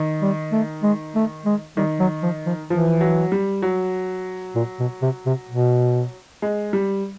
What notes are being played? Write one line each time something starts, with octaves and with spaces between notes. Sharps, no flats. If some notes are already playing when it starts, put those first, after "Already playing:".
Already playing: D#3
G3
A3
G#3
A3
G#3
D#3 G3
F#3
F3
F3
E3 F3
F#3
G3
F#3
A#2
B2
C3
C3
B2
G#3
G3